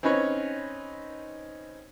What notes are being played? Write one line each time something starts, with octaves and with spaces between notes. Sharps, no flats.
C4 C#4 D#4 B4 C#5